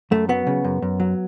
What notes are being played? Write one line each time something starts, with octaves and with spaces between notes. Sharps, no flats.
F#2 A3
F#3 B3
C#3
F#2
F#2
F#3